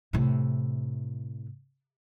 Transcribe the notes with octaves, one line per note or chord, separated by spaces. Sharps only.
A2 C3